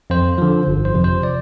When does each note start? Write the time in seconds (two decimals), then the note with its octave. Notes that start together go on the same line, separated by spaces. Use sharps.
0.10 F2 C5
0.38 D3 F3
0.67 G1
0.85 C5
0.95 F2 C3 F3
1.04 C5
1.23 D5